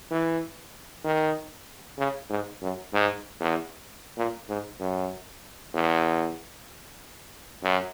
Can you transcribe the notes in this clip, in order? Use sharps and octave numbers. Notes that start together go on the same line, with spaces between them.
E3
D#3
C#3
G#2
F#2
G#2
E2
A#2
G#2
F#2
E2
F#2